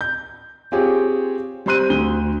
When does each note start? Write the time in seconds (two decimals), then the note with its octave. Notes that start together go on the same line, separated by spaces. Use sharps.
0.01 G6
0.72 C4 F4 G4 G#4 C#5
1.66 G3 C4 C5 C6 F#6 D#7
1.90 D2 G7